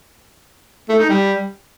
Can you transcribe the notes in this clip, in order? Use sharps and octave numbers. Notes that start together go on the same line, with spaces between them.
A3
D#4
G3